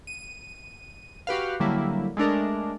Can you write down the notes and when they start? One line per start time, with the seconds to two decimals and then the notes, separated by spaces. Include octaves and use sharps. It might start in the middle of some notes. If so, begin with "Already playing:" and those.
0.07 D#7
1.27 F#4 G4 B4 F5
1.60 D3 F#3 G3 A#3 E4
2.17 G#3 A3 D4 A#4